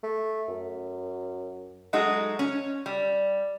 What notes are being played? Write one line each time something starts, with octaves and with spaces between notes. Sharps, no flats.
A3
F#2
F#3 G#3 A3 D#4 F#4 G#4
C#4
G3